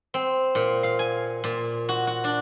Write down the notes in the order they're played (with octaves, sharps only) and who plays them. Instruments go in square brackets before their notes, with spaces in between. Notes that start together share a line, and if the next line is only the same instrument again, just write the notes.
[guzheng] C4
A#2
F5
G#5
A#2
F#4
F#4
D4